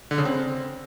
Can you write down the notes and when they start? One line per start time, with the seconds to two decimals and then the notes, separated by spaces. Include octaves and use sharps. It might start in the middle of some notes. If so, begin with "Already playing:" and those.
0.11 D3
0.18 C#3
0.25 C4